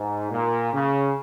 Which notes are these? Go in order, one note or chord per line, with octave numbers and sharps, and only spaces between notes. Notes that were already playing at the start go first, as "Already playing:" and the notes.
Already playing: G#2
A#2
C#3